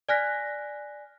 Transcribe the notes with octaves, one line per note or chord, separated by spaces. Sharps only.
D5 G#5 F6 F#6 A#6 B6